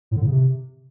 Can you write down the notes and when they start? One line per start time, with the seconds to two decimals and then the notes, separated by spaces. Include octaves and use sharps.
0.11 A2
0.16 D3
0.22 A2
0.27 C#3
0.32 C3